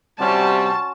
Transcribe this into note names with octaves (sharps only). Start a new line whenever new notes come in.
C3 G3 C#4 F#4 A5 C6